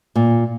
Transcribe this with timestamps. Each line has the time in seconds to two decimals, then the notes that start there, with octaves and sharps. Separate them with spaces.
0.16 A#2